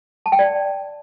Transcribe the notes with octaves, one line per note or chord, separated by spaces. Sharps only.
A5
G5
D5